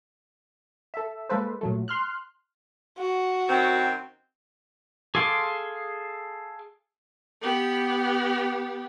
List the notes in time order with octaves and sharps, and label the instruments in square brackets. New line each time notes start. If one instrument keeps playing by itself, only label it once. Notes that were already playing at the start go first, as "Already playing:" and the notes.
[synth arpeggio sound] A4 E5
G#3 A#3 A4 B4 C5
A#2 F#3 A3
C6 F6 F#6
[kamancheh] F#4
[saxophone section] F#2 D#3 C4
[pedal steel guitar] G#4 A4 F5 C6 D6
[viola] B3 G4